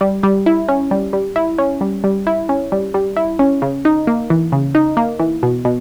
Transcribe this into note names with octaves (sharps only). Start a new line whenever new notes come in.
G3
G3
E4
C#4
G3
G3
E4
C#4
G3
G3
E4
C#4
G3
G3
E4
C#4
C#3
D#4
A#3
E3
C#3
D#4
A#3
E3
B2
B2